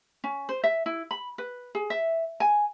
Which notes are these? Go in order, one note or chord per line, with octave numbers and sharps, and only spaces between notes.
C#4
C5
E5
E4
B5
B4
G#4
E5
G#5